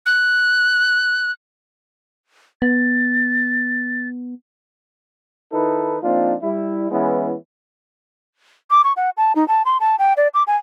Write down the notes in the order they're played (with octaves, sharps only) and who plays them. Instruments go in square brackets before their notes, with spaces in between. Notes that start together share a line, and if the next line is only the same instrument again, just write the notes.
[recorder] F#6
[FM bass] B3 [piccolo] A6
[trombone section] D#3 D#4 E4 A4 B4
F3 A#3 C4 D4 D#4 F4
G3 E4
E3 G#3 B3 C#4 E4
[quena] D6
C#6
F#5
A5
D#4
A5
C6
A5
G5
D5
D6
G#5